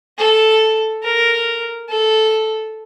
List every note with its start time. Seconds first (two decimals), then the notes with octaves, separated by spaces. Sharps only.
0.18 A4
1.03 A#4
1.89 A4